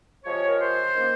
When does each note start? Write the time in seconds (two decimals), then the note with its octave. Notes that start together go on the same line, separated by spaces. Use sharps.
0.25 C3 F3 G#3 C#5
0.48 A#4
0.59 C5
0.94 D#3 A#3 C#4